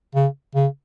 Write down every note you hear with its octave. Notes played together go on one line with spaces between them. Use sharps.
C#3
C#3